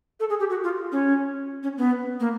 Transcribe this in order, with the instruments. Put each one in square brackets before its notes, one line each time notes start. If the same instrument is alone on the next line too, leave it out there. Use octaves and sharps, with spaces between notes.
[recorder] A4
G#4
G4
F#4
F4
C#4
C#4
B3
A#3